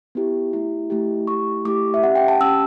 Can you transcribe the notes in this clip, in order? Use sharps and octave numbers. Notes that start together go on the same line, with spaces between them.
B3 E4 G4
A3 E4 G4
A3 E4 G4
A3 E4 G4 C#6
A3 E4 G4 D6
E5
C#4 G4 F#5
G5
A5
C#4 G4 E6